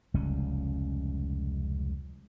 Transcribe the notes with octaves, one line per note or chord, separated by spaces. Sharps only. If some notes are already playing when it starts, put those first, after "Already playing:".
F1 C#2 G3 C#4